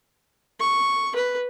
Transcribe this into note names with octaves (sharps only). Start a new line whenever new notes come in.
C#6
B4